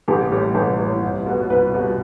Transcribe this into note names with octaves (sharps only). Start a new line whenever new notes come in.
A1 G4
A2 G3
A1
A2 G3
C2
B2 G3 B3
C2 B4
B2 G3 B3